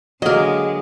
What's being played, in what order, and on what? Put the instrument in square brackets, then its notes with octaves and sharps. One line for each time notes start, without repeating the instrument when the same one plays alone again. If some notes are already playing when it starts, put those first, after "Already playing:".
[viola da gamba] D3 G#3 [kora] F#3 A#3 [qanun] A#4 D#5